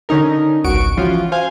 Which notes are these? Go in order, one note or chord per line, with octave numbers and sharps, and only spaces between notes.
D3 C#4 D#4 A#4
G#1 C#2 F#4 C#6 D7
E3 F3 C#4 F4 F#4
C5 F5 G#5